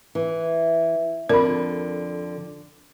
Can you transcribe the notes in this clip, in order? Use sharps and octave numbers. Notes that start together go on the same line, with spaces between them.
E3
F2 D3 A#4 D5 B5